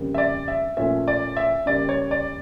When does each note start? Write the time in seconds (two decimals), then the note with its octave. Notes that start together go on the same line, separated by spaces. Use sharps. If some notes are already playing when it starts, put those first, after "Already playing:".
Already playing: F2 C#3 G3 A#3
0.14 E5
0.18 D5
0.48 E5
0.77 A#2 F3 A3 C#4 E5
1.08 D5
1.37 E5
1.66 C#3 G3 A#3 D5
1.89 C#5
2.11 D5